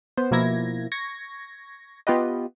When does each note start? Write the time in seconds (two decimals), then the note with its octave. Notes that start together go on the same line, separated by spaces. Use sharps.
0.17 B3 C5
0.31 B2 F3 A#3 E4 G#6 A#6
0.92 C#6 G#6 A#6
2.07 B3 F4 G4 B4 D#5